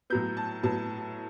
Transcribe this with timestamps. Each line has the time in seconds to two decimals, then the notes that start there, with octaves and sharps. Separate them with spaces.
0.10 A2 F#3 B3 G6
0.37 A5
0.63 A2 F#3 B3 A5